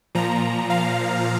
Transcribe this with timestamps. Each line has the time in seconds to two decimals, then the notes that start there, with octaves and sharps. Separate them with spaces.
0.15 A#2 F3 A#5
0.70 F5